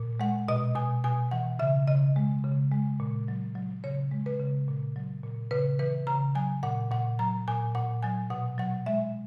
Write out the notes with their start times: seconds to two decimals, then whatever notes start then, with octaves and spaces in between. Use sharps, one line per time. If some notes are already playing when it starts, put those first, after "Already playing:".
Already playing: A#2
0.20 G#3 F#5
0.48 B2 D#5
0.75 B2 G#5
1.04 B2 G#5
1.31 E3 F#5
1.59 C#3 E5
1.88 C#3 D#5
2.16 G#3
2.44 C#3
2.72 G#3
3.00 A#2
3.28 F#3
3.55 F#3
3.84 C#3 C#5
4.11 G#3
4.26 B4
4.39 C#3
4.68 A#2
4.96 F#3
5.23 A#2
5.51 C#3 B4
5.79 E3 B4
6.07 C#3 A#5
6.35 F#3 G#5
6.63 A#2 F#5
6.91 A#2 F#5
7.19 F#3 A#5
7.47 A#2 G#5
7.75 A#2 F#5
8.03 F#3 G#5
8.30 B2 F#5
8.58 F#3 F#5
8.86 G#3 E5